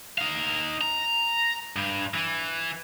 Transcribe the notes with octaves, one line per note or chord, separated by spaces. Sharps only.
D#4 F5
A#5
G2
E3